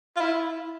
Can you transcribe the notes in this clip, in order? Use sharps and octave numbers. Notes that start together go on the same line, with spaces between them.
F4
E4